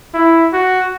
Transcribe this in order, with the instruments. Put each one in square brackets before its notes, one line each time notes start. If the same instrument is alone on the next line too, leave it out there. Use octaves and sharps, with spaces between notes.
[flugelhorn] E4
F#4